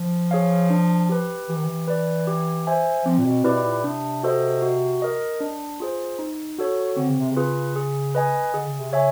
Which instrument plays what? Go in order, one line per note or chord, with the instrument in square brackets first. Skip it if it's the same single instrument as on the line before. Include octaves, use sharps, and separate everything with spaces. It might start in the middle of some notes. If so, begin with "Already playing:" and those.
Already playing: [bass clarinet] F3
[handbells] G#4 C#5 F5
D4
G4 B4
[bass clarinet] E3 [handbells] G4
[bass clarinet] D#3
E3
[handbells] B4 D5
G4
C5 E5 G#5
[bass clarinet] F3 [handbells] C4
[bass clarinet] A#2
B2
[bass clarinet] B2 [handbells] E4 G4 B4 D5
[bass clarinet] A#2
[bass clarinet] C3 [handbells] D4
[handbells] F#4 A4 C5 D#5
F#4
A#4 D#5
D4
F4 G#4 C5
D#4
F#4 A4 C#5
[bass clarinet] D3 [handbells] C4
[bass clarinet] C#3
C3
C#3
[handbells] F4 G#4 B4
G#4
B4 D#5 G#5
[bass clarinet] D3 [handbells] G#4
[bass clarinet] C#3
C3
[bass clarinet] C#3 [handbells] C#5 E5 G#5